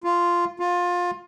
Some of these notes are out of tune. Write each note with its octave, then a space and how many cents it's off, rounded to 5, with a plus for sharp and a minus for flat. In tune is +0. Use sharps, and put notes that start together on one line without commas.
F4 -5
F4 +20